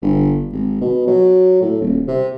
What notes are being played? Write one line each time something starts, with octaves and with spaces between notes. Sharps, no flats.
G1
G#1
B2
F#3
A2
D#1
C3